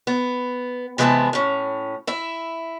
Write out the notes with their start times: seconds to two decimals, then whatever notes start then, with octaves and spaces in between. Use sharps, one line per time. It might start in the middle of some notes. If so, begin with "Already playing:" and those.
0.07 B3
0.98 C3 E3 G#3 B3 E5 A5
1.33 A2 C#4
2.07 E4 E5